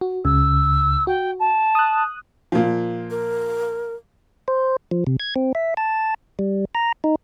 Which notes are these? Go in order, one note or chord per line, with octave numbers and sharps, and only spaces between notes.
F#4
C#2 C#3 E6
F#4 G5
A5
D#6 F#6
A#2 F3
A#4
C5
F3
C3
G#6
C4
E5
A5
G3
A#5
D#4